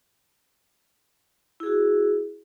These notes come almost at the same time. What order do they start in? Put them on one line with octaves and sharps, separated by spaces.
E4 G#4 F#4